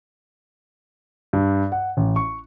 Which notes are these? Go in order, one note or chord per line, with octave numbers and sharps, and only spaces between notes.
G2
F#5
A1
C#6